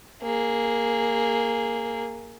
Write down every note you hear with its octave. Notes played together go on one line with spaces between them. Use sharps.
A#3 G#4